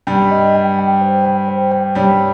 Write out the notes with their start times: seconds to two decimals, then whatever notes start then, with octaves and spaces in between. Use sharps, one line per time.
0.07 G2 G3 G5
0.31 D#5
0.55 G5
0.79 G5
1.01 C5
1.25 G5
1.48 C5
1.71 G5
1.95 G2 G3 C#5